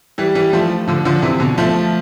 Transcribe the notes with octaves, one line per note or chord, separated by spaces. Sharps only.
E3 G3
E3 G3
F3 A3
D3 F3
D3 F3
C3 E3
B2 D3
F3 A3